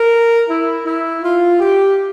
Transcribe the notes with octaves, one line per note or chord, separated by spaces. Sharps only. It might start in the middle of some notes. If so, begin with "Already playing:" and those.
Already playing: A#4
E4
E4
F4
G4